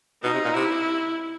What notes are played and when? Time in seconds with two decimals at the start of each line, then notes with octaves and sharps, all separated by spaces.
0.23 B2 D#4
0.34 C3
0.45 A#2
0.54 C3 E4